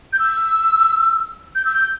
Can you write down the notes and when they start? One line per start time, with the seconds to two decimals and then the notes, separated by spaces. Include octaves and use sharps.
0.13 G6
0.19 E6
1.55 G6
1.65 E6
1.74 G6